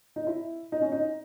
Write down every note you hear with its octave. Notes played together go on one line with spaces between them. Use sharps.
D#4
E4
D#4
C#4
D#4